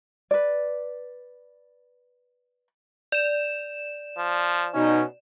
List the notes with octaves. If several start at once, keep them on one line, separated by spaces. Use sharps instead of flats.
B4 D5
D5 E7
F3
B2 C#4 D#4